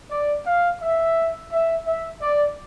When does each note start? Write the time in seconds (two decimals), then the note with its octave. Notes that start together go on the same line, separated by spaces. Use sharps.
0.11 D5
0.47 F5
0.82 E5
1.53 E5
1.87 E5
2.22 D5